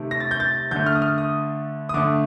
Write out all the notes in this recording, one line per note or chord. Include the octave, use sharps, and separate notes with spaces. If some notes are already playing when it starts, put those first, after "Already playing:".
Already playing: C3 D#3 A3
A#6
A6
G6
A6
D3 A3 G6
F6
D#6
F6
D#6
D#6
D3 A3 D6